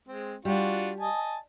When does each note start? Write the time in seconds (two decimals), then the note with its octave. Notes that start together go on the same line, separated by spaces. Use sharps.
0.08 G#3 C4
0.45 G3 D4 F4 F#4
1.00 D#5 G#5 A5